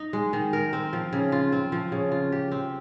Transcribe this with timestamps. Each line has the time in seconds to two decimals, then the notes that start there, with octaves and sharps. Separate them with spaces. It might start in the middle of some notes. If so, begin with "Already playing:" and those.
Already playing: D#4
0.13 G#3
0.33 D#3
0.53 A#4
0.73 C4
0.93 F3
1.13 C#3
1.32 F4
1.52 C4
1.72 F3
1.92 C#3
2.12 F4
2.32 G4
2.52 C4